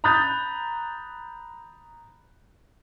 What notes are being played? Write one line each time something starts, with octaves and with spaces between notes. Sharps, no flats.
A#5 B5 D#6 F#6 G6 A6